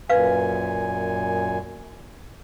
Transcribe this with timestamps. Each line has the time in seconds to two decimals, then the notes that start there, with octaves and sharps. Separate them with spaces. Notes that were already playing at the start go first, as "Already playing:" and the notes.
0.10 F#2 A#2 B4 F5 G#5